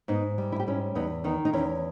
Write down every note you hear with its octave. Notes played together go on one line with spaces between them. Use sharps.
G#2 B3 D#4
G3
E4
G4
G#2 C#4 E4
E2 B3 D#4
D#3 B3 D#4
D#4
E2 C#4 E4